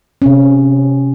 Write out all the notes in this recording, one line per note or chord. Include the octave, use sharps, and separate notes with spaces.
C3 C4 C#4